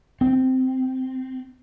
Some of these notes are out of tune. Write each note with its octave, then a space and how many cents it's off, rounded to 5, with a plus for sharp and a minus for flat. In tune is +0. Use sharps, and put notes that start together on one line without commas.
C4 -10